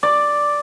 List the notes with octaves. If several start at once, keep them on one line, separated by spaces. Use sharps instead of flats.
D5